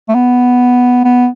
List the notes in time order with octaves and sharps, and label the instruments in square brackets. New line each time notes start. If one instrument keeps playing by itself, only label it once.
[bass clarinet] A3
B3
B3